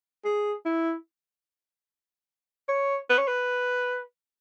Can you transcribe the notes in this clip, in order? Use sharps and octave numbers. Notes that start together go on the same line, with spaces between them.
G#4
E4
C#5
B4
C#5
B4